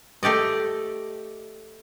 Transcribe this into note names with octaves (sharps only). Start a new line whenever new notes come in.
A3 G4 D5 D#5